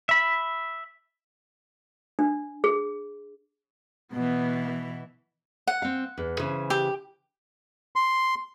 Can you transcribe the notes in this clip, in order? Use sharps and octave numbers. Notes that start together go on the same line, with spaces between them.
E5 B5
D4
G#4
B2 E3 B3
F#5
C4 F5
E2
C#3 E3 C5
G4
C6